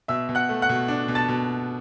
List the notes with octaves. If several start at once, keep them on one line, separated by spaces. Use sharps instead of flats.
B2 E5 E6
B2
F#5 F#6
A3
F#5 F#6
B2
D4
B2
A5 A6
B2